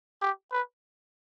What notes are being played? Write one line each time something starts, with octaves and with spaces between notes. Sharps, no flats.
G4
B4